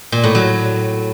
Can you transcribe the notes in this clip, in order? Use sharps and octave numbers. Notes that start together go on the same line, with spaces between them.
A#2
A2
F#3